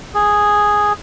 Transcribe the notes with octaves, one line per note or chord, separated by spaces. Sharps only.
G#4